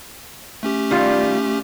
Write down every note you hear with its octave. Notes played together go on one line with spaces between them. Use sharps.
A3 C#4 G4
D#3 G3 F4